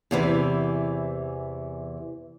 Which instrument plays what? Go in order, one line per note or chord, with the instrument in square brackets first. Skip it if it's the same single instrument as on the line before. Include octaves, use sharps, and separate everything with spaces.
[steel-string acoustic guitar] E2 C3 E3